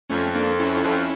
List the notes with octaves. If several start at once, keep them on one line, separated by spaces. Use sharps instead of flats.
F2 A3 C#4
A#3 D4
C#4 E4
F2